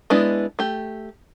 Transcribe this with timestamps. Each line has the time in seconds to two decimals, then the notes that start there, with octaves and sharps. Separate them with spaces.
0.10 G#3 B3 D4 E4
0.59 A3 G4